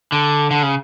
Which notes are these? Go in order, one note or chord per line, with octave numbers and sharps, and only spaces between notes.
D3
D3
C#3